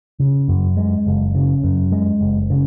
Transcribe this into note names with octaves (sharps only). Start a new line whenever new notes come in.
C#3
F#2
G#3
F#1
C#3
F#2
G#3
F#1
C#3